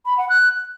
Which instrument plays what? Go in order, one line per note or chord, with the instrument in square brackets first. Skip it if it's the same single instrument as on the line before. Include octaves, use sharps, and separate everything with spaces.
[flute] B5
F#5
F#6